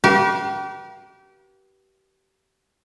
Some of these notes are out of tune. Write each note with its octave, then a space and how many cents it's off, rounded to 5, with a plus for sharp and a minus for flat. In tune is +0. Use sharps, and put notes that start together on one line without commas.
G4 -35 B4 -40 F5 +0